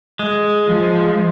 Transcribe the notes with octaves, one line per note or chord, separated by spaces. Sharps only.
G#3
F3